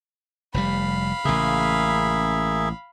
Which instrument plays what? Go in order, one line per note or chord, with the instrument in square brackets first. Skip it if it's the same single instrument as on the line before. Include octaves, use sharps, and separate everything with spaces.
[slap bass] F1 B2 G3 [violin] F5 B5
[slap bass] A1 C#3 [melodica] A#3 G#4 E5